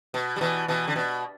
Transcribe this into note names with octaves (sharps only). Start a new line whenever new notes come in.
B2
G3
B2 E3
B2 E3
D3
B2